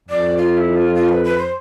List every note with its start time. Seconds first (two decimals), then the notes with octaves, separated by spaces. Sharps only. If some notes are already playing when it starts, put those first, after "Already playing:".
0.09 F2 D5
0.37 F4
0.57 E4
0.76 F4
0.95 F4
1.09 B4
1.24 B4
1.38 C5